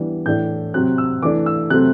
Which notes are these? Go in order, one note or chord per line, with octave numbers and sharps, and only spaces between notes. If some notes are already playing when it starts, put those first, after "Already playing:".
Already playing: E3 G3 B3 D4
A2 E3 A3 D4 G6
C3 F#3 C4 F#6
E6
E3 A3 D4 D6
E6
C3 F#3 A3 C4 F#6